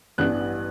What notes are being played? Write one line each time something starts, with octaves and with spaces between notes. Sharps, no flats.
A1 G2 E3 B3 D4 F#6